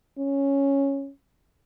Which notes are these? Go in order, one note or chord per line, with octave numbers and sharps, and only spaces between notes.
C#4